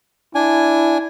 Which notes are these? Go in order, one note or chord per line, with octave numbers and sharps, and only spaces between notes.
D4 E4 G#5